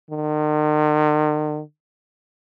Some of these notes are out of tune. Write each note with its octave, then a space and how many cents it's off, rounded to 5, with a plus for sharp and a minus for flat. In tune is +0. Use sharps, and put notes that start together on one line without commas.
D#3 -45